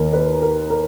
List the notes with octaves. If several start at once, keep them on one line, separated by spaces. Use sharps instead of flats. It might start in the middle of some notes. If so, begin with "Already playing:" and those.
Already playing: D#2 D#3 A#4
B4
A#4
A#4